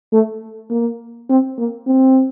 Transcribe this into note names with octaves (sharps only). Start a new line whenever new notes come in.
A3
A#3
C4
A#3
C4